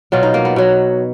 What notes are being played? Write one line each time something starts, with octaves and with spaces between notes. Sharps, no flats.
B2 F#3 F4
D#4
A#3
B3
B2 F#3